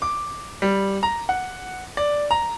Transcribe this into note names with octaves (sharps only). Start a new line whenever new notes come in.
D6
G3
A#5
F#5
D5
A#5